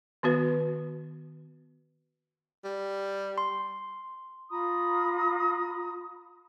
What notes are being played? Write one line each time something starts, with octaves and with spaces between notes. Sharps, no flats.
D#3 B3 F#4 B4
G3
C6
F4 A#5 B5 D#6